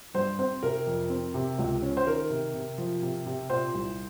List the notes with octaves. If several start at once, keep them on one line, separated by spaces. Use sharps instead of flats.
G2 C5
C4 C5
C3 A#4
F2
C4
C3
C#2
C#4
C5
D#3 A#4
C3
C3
F3
C3
C3
A#2 C5
C2